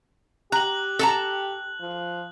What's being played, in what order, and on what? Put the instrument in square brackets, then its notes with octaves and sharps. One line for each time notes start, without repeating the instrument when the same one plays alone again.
[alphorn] G4 [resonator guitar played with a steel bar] A#5 [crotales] F#6 F#7
[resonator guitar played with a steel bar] A4 A5 A#5
[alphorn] F3